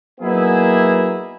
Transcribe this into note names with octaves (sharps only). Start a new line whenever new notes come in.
F#3 A#3 B3 D#4 E4 G#4